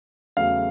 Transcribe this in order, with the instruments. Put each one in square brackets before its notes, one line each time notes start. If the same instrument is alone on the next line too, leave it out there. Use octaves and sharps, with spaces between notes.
[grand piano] E2 C#3 F#3 A3 F5